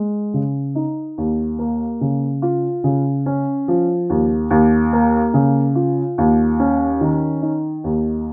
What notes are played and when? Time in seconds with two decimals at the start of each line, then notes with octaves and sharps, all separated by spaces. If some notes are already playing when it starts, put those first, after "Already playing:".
Already playing: G#3
0.34 C#3
0.75 D#4
1.18 D#2
1.59 A#3
2.01 C#3
2.42 F4
2.84 C#3
3.26 C#4
3.68 F3
4.10 D#2
4.51 D#2
4.93 A#3
5.34 C#3
5.75 F4
6.18 D#2
6.60 C#4
7.01 D#3
7.42 D#4
7.84 D#2